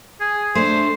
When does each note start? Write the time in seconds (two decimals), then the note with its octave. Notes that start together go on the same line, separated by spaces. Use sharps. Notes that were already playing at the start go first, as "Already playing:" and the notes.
0.20 G#4
0.55 A3 D4 C5